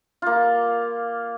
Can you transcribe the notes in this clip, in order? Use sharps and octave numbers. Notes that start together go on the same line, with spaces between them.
A#3 F4